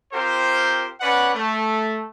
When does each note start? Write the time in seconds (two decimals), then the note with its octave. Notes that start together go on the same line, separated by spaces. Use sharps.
0.13 C4 F4 G4 A#4 C5
1.01 C#4 B4 D5 F#5
1.35 A3